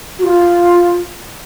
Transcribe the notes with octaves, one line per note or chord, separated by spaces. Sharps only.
F#4
F4